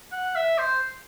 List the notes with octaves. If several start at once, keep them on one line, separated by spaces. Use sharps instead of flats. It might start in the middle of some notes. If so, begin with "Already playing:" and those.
F#5
E5
C5